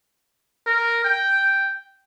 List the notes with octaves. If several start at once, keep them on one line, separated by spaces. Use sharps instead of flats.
A#4
G5